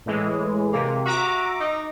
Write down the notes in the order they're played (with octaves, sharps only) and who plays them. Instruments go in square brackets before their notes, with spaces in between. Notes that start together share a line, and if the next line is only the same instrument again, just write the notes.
[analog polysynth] A2 E3 G#3
[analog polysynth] C3 [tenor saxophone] A#3
[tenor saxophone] F#4 [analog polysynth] E5 A#5 D6
[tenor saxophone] D#4